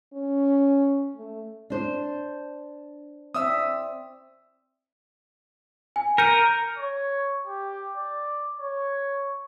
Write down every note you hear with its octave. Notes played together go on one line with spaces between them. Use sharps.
C#4
A3
D4 C5
C4 D5 E5 D#6 E6
G#5
A#4 G6 C#7 D#7
C#5
G4
D5
C#5